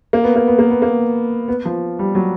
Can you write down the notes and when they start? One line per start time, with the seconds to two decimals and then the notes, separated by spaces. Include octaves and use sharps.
0.13 A#3
0.24 B3
0.36 A#3
0.47 B3
0.59 A#3
0.70 B3
0.82 A#3
1.48 B3
1.65 F3
1.99 G3
2.15 F#3